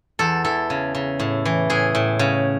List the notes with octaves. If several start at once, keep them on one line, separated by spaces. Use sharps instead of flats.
E2 A4
E3 A4
C#3
C#3
A2
E3
A2 G#4
A2
C#3